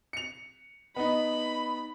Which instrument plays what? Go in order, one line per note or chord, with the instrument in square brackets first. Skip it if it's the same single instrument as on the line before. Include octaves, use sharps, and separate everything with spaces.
[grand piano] C#7 F7
[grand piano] B3 D#4 [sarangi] B5